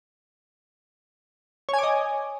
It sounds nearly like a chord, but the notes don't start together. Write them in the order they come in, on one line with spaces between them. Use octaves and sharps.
C#5 G#5 D6 D#5